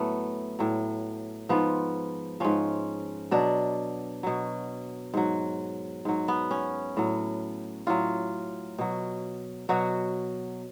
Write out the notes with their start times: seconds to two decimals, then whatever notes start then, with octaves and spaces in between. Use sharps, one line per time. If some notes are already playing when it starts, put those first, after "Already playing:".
Already playing: A2 F#3 A3 B3
0.59 A2 F#3
1.49 G#2 F3 B3
2.40 G#2 F3 C#4
3.31 B2 F#3 D4
4.23 B2 F#3
5.14 G#2 F#3
6.05 G#2 F#3
6.28 B3
6.51 C#4
6.97 A2 F#3
7.87 A2 F#3 F4
8.78 B2 F#3
9.69 B2 F#3 F#4